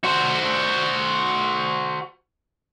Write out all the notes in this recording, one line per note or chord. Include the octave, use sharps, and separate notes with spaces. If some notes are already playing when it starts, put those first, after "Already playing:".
F#4 C5